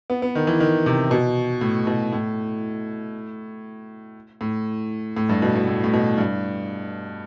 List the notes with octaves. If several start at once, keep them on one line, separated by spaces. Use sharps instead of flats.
B3
B3
D#3
E3
D#3
C3
B2
A2
B2
A2
A2
A2
G2
B2
B2
A2
A2
B2
G2